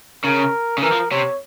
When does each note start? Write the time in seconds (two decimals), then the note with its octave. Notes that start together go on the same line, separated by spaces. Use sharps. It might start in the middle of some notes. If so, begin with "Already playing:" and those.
0.24 C#3 A#4
0.78 C#3
0.82 E3 A#4
0.92 F3
1.11 C3 C#5